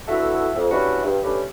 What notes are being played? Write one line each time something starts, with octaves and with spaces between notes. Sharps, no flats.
D3 B3 E4 F#4 A4 E5
F2
G3 C#4 D4 E4 F#4 B4
G2
A3 C#4 D4 G4 B4